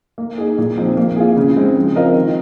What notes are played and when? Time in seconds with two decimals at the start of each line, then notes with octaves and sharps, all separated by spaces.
0.18 A#3
0.38 D#4 G#4
0.58 A#2
0.77 F3 C4 D#4
0.97 A#3
1.16 F4 G#4
1.37 C#3
1.57 G#3 C4
1.76 F3
1.96 C4 F4 A#4 D#5
2.15 D#3